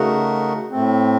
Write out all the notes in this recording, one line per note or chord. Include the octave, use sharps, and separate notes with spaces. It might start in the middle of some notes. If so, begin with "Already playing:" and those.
Already playing: C#3 A3 D#4 F#4 A#4
A2 A3 C4